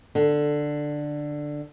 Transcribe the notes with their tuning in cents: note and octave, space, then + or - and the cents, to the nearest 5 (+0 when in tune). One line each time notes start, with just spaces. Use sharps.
D3 +10